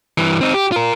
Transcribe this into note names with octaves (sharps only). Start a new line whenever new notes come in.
G2 E3
C4 D#4
G4
F4 A#4